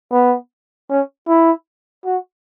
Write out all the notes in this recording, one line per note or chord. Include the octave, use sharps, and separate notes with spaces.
B3
C#4
E4
F#4